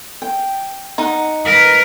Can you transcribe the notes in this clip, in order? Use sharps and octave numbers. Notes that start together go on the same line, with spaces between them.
G5
D#4 F#5
A#4 B4